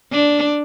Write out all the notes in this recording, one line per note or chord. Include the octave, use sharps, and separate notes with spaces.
D4